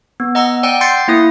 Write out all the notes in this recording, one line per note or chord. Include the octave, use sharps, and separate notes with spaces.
B3
D#5 F#5 A#5 E6
D5 F#5 G5 E6
C6 G6 A6 C7 C#7
A#3 E4 D#6